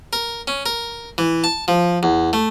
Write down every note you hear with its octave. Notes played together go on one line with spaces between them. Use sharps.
A#4
C#4
A#4
E3
A5
F3
E2
A3